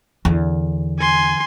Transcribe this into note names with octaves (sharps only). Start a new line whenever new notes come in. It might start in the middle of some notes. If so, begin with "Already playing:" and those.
E2 D3
G#5 C6